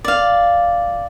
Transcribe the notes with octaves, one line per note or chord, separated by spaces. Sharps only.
D5 F5